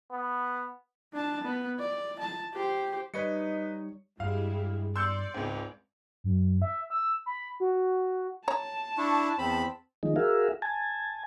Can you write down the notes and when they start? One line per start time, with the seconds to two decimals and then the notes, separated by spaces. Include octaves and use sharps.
0.12 B3
1.13 D4 A5
1.44 B3
1.79 D5
2.20 A5
2.54 G4 C5
3.14 G3 D#4 B4 C#5 D#5 C#7
4.20 G2 G3 G#3 E4 F5
4.96 D5 C6 E6 G6 C#7
5.34 C#2 G#2 C4
6.24 F#2
6.62 E5
6.90 E6
7.26 B5
7.60 F#4
8.48 C#5 A5 A#5
8.98 D4 E4 C#6
9.38 E2 C4 B5
10.03 D#3 F3 G#3 D#4
10.16 F#4 G#4 A#4 E5 F5
10.62 G#5 A5